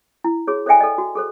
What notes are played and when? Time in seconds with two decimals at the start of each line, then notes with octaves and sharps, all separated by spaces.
0.24 E4
0.47 F#4 G#4 C#5
0.66 A4 C5 D5 E5 G5 G#5
0.81 A4 D5 D#5
0.98 F#4
1.15 G#4 A4 C5